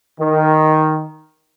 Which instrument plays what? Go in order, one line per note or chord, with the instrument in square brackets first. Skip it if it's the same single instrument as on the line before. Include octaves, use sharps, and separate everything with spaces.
[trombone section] D#3